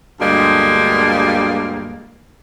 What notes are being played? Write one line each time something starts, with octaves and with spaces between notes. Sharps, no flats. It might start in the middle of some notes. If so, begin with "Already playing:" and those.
D2 G2 G3 G#3 A#3